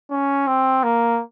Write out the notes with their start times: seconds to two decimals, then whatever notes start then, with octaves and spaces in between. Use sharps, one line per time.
0.11 C#4
0.47 C4
0.83 A#3